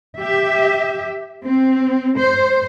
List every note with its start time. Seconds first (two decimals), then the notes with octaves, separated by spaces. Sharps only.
0.19 G4 E5
1.44 C4
2.17 C5